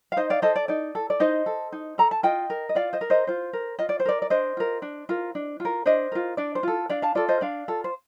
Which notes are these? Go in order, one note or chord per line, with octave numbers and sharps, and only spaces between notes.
F5
D#4 C5 D#5
D5 F5
A4 C5 D#5
D5
D#4 D5
A4
D5
D#4 C5 D#5
A4
D#4
A4 A#5
A5
F4 D#5 G5
A#4
D#5
F4 D5 F5
C5 D#5
A#4
C5 D#5
F4 C5
A#4
F4 D#5
D5
C5
A#4 D5
D5
D4 C5 D#5
F4 A#4
D4
F4 A#4
D4
F4
A#4
D4 C5 D#5
F4 A#4
D4 D5
C5
F4 A4
D4 D5 F5
F5 A5
F4 A4 D5
C5 D#5
D4 D5 F5
F4 A4
C5